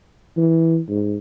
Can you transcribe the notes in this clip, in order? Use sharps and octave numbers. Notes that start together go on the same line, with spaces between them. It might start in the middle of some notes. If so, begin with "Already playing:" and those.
E3
G#2